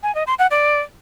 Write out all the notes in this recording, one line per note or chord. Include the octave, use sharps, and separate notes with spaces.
G#5
D#5
C6
F#5
D5